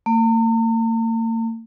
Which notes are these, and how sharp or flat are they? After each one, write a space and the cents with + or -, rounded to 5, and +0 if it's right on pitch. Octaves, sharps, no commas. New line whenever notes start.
A#3 -45